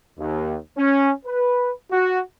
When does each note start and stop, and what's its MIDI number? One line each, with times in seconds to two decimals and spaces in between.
0.19 0.56 39
0.78 1.11 61
1.26 1.70 71
1.91 2.20 66